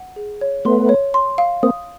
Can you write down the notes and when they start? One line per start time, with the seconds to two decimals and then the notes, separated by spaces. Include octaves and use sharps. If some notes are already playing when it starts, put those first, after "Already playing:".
Already playing: F#5
0.16 G#4
0.41 C#5
0.65 A3 B3 C6
0.89 C#5
1.14 C6
1.38 F5
1.63 A#3 C4 D#6